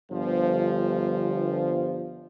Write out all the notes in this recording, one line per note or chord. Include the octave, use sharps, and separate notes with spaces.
G1 F3